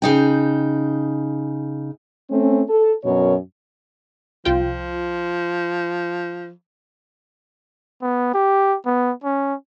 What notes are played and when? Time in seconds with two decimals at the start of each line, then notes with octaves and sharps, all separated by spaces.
0.02 C#3 D#4 G5
2.29 A3 C4 C#4
2.68 A4
3.04 F#2 B2 A#4 C#5
4.45 C2 F3 F4 G5
8.02 B3
8.34 G4
8.86 B3
9.24 C#4